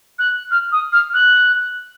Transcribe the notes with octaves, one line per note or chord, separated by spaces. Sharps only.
F#6
F6
D#6
F6
F#6